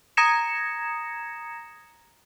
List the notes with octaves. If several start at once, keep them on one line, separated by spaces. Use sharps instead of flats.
A#5 D#6 G#6 A#6 C#7 E7